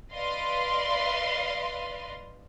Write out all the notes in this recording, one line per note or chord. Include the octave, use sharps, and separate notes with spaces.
B4 D5 D#5 F5 C6